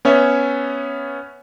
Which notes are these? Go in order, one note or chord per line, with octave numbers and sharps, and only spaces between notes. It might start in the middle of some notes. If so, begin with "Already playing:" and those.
B3 C#4 C#5 E5